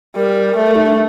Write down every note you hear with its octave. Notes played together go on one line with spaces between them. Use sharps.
G3 A#4
A3
A#4
D#4
D4